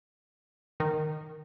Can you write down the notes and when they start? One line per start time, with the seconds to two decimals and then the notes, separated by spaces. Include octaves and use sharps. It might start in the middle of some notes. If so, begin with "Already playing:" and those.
0.80 D#3